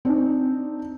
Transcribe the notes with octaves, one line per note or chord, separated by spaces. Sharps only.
C4 D4 D#4